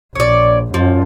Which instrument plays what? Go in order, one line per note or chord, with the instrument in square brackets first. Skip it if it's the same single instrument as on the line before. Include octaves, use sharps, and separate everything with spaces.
[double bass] A#1 [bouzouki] C#5 D5
[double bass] F#2 [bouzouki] F3